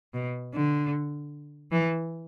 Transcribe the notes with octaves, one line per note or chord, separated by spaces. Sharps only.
B2
D3
E3